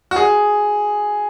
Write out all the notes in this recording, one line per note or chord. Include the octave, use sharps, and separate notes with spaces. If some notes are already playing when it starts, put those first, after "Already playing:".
F#4
G#4